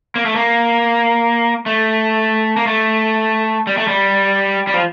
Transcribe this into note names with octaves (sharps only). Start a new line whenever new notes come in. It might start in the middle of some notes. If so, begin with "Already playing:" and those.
A#3
A3
A#3
A3
A#3
A3
G3
A3
G3
G3
F3